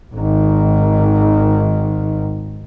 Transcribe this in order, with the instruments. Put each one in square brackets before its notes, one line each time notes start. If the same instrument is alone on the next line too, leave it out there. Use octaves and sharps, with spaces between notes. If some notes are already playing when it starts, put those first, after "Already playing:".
[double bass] G#1 D#3